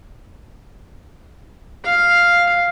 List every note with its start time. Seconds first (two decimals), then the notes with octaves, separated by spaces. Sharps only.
1.84 F5